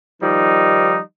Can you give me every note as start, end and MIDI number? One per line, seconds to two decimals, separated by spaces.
0.21 0.99 51
0.21 0.99 53
0.21 0.99 55
0.21 0.99 63